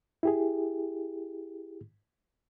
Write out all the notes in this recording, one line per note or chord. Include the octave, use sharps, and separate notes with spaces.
E4 G4 G#4